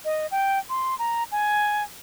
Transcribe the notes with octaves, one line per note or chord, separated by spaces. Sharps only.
D#5
G5
C6
A#5
G#5